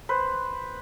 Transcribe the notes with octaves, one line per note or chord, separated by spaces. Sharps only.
B4 C5